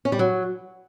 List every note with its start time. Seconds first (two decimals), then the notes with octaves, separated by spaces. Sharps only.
0.05 C#4
0.12 G3
0.19 F#3